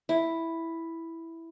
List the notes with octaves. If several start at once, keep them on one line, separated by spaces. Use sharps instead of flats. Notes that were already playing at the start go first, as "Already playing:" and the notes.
E4